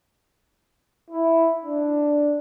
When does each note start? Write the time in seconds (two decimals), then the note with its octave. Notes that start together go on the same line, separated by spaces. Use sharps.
1.10 E4
1.63 D4